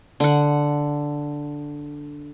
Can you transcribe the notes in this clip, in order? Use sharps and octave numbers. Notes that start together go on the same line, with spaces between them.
D3 F#5